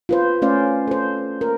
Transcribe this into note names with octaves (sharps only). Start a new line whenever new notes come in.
F4 B4 C5
A3 C#4 C5 D5 F5
A4 C5
A#4